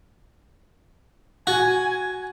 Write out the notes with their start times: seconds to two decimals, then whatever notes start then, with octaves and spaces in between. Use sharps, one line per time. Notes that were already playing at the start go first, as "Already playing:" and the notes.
1.47 F#4 G#5